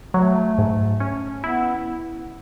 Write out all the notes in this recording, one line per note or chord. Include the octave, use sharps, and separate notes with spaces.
F#3 A3
G#2
C#4
B3 E4